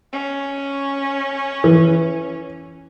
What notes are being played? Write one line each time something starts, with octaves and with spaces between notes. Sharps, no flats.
C#4
E3